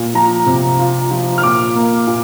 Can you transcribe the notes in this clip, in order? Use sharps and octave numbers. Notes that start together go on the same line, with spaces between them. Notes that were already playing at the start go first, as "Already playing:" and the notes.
Already playing: A#2
F3 A#5
C3
F4
F3
F6
A#2 D6
A#3
A#2